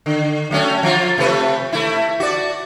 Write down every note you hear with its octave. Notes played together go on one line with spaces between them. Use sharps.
D3
F#3 A3 C#4
F3 F4
C3 A3 B4
A3 E4
F#4 D5